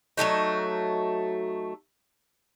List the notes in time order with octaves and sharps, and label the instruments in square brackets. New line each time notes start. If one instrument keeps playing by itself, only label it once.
[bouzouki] F#3 G#3 A3 D#4